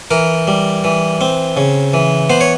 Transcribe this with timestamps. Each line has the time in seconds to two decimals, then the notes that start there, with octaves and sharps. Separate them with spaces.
0.11 E3 A#4
0.47 G3
0.84 E3
1.21 C4
1.57 C#3
1.94 E3
2.30 B3 C5
2.41 C#5